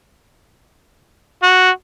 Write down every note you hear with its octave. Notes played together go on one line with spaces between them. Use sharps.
F#4